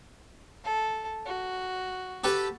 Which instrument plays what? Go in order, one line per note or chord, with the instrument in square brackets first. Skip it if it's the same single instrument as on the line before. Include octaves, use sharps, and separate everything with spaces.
[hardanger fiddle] A4
F#4
[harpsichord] G4 A4 B4